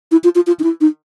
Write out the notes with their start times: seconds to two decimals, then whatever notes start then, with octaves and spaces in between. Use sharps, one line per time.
0.12 E4
0.24 F4
0.35 F4
0.47 F4
0.60 D#4
0.63 E4
0.81 D#4